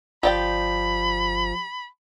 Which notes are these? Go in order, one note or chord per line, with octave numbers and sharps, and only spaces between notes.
G1 F3 G4 D5 G5 B5